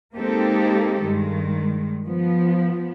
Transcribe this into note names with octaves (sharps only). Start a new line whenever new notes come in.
G#3 A#3 C4 D#4 G4 A4
G2 D#3 G#3
F3 B3